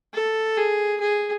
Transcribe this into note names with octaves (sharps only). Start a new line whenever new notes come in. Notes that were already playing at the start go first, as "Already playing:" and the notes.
A4
G#4
G#4